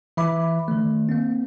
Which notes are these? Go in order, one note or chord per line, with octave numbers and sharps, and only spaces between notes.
E3 E5 B5 D6
D#3 A3
A#3 C4